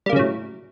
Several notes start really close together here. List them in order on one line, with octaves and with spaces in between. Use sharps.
G3 A#3 C#3 F#3 A2